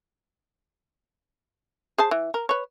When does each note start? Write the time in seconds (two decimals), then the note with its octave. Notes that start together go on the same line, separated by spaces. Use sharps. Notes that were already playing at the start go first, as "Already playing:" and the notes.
1.98 G#4 C5 A5
2.11 E3
2.34 A#4
2.49 B4 C#5